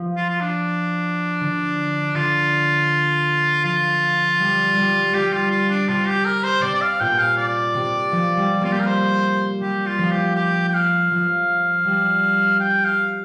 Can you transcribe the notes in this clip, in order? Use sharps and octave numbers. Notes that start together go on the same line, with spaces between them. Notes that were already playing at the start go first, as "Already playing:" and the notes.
Already playing: F3
F4
F4
D4
D3
D3 F4
F3 F4
G3
G3
G3 G4
F4
F4
D4
C3 F4
G4
A#4
C5
C3 D5
D5
F5
A#2 G5
F5
D5
C3
F3
G3
A#3 F4
G4
A#4
C5
G3 G4
F4
F3
G4
G4
G5
F5
F3
G3
G5
F5